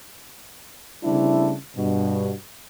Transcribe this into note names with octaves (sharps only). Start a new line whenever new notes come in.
C#3 G3 A3 C4 D4 E4
G2 B2